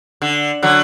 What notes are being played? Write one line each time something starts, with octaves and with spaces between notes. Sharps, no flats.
D3
D3 F#3